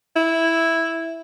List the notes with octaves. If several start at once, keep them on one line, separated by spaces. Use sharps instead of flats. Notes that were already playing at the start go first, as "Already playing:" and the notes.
E4